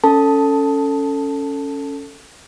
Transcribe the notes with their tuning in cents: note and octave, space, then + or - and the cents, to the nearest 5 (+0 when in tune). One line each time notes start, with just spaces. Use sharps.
C#4 +5 A4 +15 A5 +0